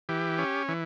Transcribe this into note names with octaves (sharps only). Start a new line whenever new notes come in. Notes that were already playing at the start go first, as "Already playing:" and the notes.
E3 G4
C#4
E3